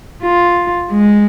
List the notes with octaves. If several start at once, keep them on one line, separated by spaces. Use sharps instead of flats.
F4
G#3